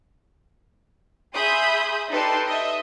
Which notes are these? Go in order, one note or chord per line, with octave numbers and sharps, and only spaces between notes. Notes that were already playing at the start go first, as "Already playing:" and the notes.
G#4 E5 B5 C6 D#6 G6
D#4 G4 A4 B4 D5 C6
D#5 E5